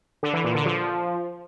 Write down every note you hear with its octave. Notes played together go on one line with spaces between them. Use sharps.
D3
E3
A#2
D3
F3